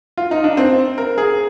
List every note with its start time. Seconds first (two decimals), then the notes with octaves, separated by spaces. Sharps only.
0.17 F4
0.31 D#4
0.44 D4
0.57 C4
0.98 A#4
1.18 G#4